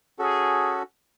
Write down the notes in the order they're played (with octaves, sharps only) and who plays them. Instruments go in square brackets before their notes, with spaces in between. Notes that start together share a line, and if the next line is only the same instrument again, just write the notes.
[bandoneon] C#4 F#4 A4 [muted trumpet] G#4